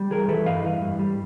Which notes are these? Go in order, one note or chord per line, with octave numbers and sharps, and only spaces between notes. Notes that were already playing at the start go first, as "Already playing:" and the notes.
Already playing: G3
E3 G#4 A#4
E3 A4 B4
G2 D#5 F5
E3
G2
G3